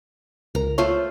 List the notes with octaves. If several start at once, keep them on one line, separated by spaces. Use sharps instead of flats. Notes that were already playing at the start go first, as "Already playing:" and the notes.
C#2 A#4 A#5
A3 F4 C5 C#5